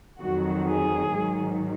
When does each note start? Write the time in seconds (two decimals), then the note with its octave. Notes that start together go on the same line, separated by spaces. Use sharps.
0.20 F2 D#3 F#3 F#4
0.67 G#4
1.12 G#2 D#3 F#3